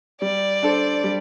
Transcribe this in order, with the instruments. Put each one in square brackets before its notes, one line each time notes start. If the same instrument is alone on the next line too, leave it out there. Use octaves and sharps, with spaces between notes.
[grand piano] G3 [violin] D5
[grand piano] D4 A4 C5
G3